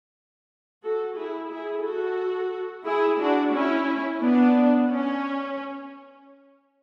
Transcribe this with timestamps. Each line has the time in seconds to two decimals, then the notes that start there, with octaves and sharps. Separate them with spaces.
0.83 F#4 A4
1.16 E4 G#4
1.51 E4 G#4
1.84 F#4 A4
2.85 E4 G#4
3.19 D4 F#4
3.54 C#4 E4
4.20 B3 D4
4.88 C#4